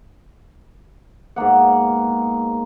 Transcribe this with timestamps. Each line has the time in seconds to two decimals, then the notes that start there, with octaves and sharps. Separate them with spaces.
1.36 G#2 B2 A#3 F#5